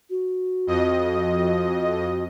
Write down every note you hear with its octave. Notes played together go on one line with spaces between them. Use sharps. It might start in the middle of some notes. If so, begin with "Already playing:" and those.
F#4
F2 D#5